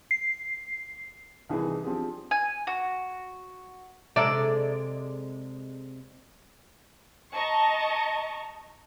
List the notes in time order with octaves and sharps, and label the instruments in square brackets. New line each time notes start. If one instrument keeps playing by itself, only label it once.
[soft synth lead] C7
[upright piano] C2 D#3 E3 D#4 E4 G#4
F3 C4 D4 G4 G#4
[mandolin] G#5
F#4
[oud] C3 G#3 A4 [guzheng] D5 [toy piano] E5 A#5 E6
[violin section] D#5 A5 A#5 C#6